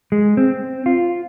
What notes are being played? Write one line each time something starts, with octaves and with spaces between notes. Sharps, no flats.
G#3
C4
F4